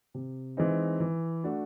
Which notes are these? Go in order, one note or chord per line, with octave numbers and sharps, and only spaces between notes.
C3
E3 G#3 C4 D#4
E3
A3 D4 F#4